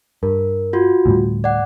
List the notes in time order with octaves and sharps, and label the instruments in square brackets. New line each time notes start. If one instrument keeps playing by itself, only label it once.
[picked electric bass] G2 [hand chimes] A#4
[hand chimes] F4 F#4
[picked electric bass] D2 A2 G3
[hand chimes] D5 F#5